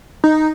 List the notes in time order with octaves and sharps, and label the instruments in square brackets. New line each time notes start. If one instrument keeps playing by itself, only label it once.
[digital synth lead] D#4